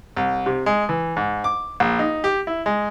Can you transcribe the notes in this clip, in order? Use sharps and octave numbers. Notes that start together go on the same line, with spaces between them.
C2
C3
G#3
E3
G#2
D6
A#1
D#4
G4
E4
G#3